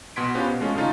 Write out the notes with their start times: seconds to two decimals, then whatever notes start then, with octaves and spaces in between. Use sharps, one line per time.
0.16 B2 F#5 C6 G#6 B6 D7
0.35 B3 C#4 F4 G4 B4 C5
0.48 B2
0.61 G#3 A3 C#4 F4
0.75 G#1 C#3 A3 D#4 F4 A6